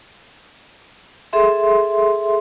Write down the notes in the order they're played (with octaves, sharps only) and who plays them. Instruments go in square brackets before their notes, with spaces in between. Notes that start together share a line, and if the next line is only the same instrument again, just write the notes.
[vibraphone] G#4 A4 E5 C6